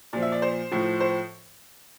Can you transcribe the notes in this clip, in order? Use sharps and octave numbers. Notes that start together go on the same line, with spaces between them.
A#2 F3 D5
E5
D5
C5
A2 F3
C5